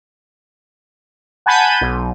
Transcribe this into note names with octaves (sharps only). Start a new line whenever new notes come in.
F#5 G#5 A5 B5 G6 D#7
B1